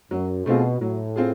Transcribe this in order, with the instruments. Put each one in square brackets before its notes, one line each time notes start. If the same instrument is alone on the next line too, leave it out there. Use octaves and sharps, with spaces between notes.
[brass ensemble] F#2 [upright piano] F#3
[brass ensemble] B2 [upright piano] A3 C4 F4 G#4
[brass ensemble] A2 [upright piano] F#3
[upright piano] C4 F4 G#4